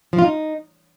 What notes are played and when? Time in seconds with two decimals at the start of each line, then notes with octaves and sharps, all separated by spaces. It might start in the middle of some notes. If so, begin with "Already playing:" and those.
0.13 F3
0.19 F4
0.24 D#4